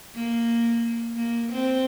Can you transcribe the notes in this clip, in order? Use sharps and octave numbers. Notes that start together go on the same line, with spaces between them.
A#3
A#3
C4